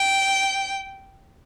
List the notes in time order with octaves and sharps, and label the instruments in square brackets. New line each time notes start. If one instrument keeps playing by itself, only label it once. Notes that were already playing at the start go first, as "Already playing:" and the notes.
Already playing: [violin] G5